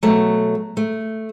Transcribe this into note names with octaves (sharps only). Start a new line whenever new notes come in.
B2 F#3 A3
A3